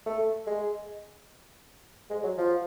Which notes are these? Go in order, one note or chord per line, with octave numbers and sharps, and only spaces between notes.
A3
G#3
G#3
F#3
F3